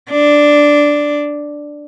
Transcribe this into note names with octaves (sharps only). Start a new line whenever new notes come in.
D4